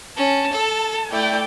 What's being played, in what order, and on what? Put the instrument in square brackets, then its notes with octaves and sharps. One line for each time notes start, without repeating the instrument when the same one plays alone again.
[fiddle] C#4 [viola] A5
[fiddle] A4
[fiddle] A3 E4 [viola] D5 G5